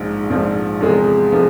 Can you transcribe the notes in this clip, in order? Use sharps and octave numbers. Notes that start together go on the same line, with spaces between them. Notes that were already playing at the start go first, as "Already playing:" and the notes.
Already playing: A#1 G#2 F3
A#1 G#2 F3
E2 C3 F3 G#3
C3 F3 G#3